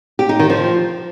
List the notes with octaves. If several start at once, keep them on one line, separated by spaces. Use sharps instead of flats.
G4
D#4
D#3
F3